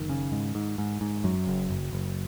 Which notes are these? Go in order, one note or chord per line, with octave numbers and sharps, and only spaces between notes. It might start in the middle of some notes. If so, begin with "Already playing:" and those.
Already playing: F#1 D#3
C#3
G#2
G#2
G#2
G#2
F#2 F#3
F#1
F#1
F#1